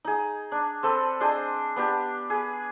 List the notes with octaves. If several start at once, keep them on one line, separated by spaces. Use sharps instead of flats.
D#4 G#4
D4
C4 A4 B4
D4 G#4 C5 D#5
B3 D4 G4
G#4 B4